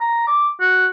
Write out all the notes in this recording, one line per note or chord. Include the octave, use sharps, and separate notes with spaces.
A#5
D6
F#4